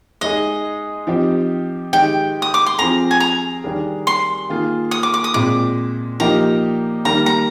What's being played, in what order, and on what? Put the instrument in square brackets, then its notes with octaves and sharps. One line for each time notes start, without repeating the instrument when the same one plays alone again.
[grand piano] G#3 D#4 G#4 [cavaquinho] D#5
[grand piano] F3 C4 D#4 G4
[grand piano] D#3 G#3 D#4 G4 [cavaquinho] G5
[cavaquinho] D#6
D6
C6
[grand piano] F3 C4 F4 G#4 [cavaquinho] A#5
[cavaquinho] G#5
A#5
[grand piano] D#3 G3 D4 G#4
[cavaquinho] C6
[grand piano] D#3 A#3 F4 G#4
[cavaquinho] D#6
D6
D6
D#6
[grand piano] A#2 G#3 C4 [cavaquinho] D6
[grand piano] F3 A#3 D#4 G4 [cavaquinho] A#5
[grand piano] D#3 G3 A#3 [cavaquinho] A#5
[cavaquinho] A#5